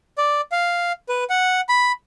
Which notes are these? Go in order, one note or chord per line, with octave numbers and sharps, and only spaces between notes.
D5
F5
B4
F#5
B5